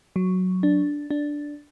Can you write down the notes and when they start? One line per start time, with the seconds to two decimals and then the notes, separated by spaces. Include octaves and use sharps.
0.16 F#3
0.63 D4
1.11 D4